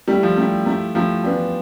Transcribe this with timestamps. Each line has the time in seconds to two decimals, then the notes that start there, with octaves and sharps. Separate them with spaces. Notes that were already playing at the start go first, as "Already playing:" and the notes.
0.08 G3 A3 E4 G4
0.23 F3
0.37 A3 E4 G4
0.66 A3 E4 G4
0.95 F3 A3 E4 G4
1.24 E3 B3 D4 G4